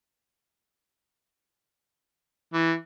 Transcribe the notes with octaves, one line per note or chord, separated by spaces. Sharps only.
E3